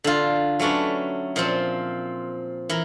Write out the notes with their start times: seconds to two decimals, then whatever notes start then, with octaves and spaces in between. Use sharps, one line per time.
0.04 D3 F4
0.60 F#3 A3 C#4 D4 B4
1.36 A#2 F3 C4
2.69 E3 A#4